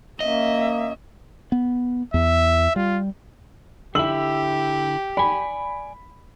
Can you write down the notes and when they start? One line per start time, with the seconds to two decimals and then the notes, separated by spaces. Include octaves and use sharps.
0.20 A#3 C#4 D#5 E5
1.52 B3
2.14 E2 E5
2.76 G3 F4
3.95 D3 E4 G4 E6 F#7
5.17 D5 G#5 B5